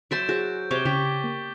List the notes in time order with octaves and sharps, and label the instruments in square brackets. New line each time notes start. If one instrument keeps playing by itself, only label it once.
[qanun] F#3 E5 C6 [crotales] G6 A6 D7
[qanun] F#4 [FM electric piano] G#4 C5
[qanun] C3 C#5 D6 [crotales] C#6 G7
[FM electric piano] C#3 [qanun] G4 C#5 [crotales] D6 B6
[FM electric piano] A#3